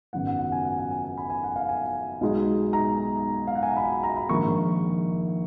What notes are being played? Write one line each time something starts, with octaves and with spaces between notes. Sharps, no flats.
G#1 F#2 C#3 F#3 B3 F#5
F#5
F#5
G#5
F#5
F#5
G#5
G#5
B5
G#5
F#5
F5
G#5
B1 B2 G#3 D#4
A#5
F5
F#5
G#5
A#5
B5
A#5
B5
A#1 G#2 D#3 A#3 C#6